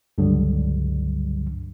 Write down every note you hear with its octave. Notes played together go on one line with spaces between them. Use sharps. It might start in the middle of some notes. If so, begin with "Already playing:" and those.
C#2 G2 D3 F#3 G3